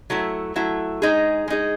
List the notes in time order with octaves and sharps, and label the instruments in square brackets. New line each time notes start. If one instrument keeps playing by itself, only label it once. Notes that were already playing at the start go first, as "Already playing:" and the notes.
[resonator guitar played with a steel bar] F#3 A3 E4
F#3 A3 E4
G#3 D#4 G#4
G#3 D#4 G#4